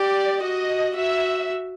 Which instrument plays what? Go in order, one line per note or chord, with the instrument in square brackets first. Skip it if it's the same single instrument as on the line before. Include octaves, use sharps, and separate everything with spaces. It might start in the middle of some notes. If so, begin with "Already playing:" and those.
Already playing: [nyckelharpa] G4 [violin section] D5
[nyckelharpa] F#4 [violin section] D#5
[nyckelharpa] F#4 [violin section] E5